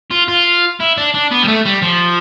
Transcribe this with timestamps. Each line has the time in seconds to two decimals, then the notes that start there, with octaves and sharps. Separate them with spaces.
0.11 F4
0.28 F4
0.80 E4
0.97 D4
1.14 D4
1.31 B3
1.43 G3
1.48 A3
1.66 G3
1.83 F3